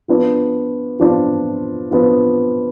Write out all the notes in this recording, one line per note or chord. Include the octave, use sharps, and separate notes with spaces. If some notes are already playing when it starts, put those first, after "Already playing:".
F3 B3 D4 F4
F3 B3 D4 F4
F3 B3 D4 F4